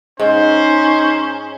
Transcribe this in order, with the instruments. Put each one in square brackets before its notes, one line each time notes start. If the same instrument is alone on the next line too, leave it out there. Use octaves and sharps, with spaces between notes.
[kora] G#2 [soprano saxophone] C#4 [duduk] D#4 [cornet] C5